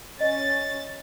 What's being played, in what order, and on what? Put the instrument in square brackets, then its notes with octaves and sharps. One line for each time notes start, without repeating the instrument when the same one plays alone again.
[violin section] C#4 A6 [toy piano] D#5